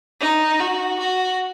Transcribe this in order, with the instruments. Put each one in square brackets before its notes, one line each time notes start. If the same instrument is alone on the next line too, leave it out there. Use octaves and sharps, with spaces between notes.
[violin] D#4
F#4
F#4